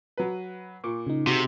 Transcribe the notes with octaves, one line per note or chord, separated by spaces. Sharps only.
F#3 B4
A#2 C#6 D6
C#3 D#4
C3 D#4 F#4 G#4